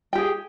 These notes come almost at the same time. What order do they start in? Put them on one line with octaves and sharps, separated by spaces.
G5 G4 G#4